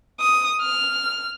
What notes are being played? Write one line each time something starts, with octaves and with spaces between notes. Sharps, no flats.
D#6
F6